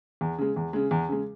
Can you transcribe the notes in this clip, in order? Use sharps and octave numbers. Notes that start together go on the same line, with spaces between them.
E2
C#3 G#3
E2
C#3 G#3
E2
C#3 G#3